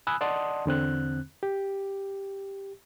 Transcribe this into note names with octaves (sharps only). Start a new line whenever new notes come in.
G#5 B5 D#6 E6 F#6
D5 D#5 F#5 A5 C6 D#6
E2 D3 C4 F#6
G4